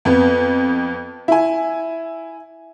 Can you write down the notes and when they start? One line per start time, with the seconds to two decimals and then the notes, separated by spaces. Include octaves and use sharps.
0.05 F2 B3
1.28 E4 G#5